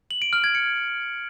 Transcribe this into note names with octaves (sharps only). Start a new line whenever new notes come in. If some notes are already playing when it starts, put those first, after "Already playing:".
F#7
D7
F6
G#6
C#7